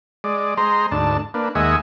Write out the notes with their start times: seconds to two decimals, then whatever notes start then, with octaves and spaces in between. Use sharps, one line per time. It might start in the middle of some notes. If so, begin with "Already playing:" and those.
0.24 G#3 D5
0.57 G#3 C5 A#5 C6
0.91 D2 G#2 D4 A5
1.34 A#3 D4 B4
1.55 D#2 G#3 D#5 E5 F#5 G#5